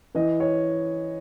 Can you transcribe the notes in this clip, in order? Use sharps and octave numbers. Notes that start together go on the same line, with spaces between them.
E3 D#5
C#5